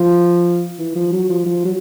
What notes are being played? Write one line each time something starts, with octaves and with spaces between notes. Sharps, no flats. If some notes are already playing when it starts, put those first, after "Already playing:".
Already playing: F3
E3
F3
F#3
F3
F3
F#3